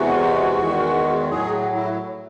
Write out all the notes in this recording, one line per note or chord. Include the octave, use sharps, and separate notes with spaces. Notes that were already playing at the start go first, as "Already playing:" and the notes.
Already playing: E2 C3 E3 G#3 F#4
E2 D#3 G#3
A2 F#3 G#4
E4